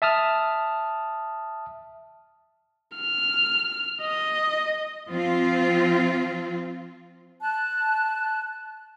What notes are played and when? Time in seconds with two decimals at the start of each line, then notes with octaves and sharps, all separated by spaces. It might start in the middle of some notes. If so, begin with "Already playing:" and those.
0.02 E5 A5 D#6 F6
2.96 F6
4.01 D#5
5.10 F3 C4 F4
7.41 A5 F#6